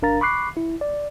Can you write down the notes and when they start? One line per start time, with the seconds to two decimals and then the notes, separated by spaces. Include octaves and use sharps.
0.02 G#1 D4 A#4 F5 A#5 A6
0.21 B5 C#6 D6 F#6 C7
0.57 E4
0.81 D5